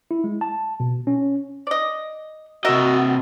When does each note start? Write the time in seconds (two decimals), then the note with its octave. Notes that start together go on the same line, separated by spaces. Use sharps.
0.11 E4
0.24 G#3
0.41 A5
0.80 B2
1.07 C#4
1.67 D5 D#5
2.65 C3 F#4 A#4 D#5 E5